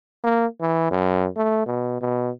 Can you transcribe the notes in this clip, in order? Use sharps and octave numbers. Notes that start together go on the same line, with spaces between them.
A#3
E3
F#2
A3
B2
B2